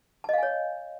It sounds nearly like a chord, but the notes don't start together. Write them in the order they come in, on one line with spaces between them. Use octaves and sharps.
A5 D#5 F5 G#5 C#5